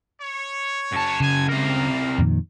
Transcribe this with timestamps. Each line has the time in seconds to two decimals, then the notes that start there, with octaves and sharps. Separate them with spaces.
0.20 C#5
0.92 F#2 A5
1.20 C#3 G#5
1.48 C3 A#3 A#4 F5
2.18 F2 A#2 D#3